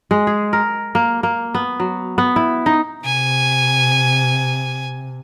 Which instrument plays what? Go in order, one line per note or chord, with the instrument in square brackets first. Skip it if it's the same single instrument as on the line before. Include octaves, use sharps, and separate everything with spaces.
[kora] G#3
G#4
A#4
A#3
A#3
B3
F#3
B3
E4
D#4
[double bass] C3 [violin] G#5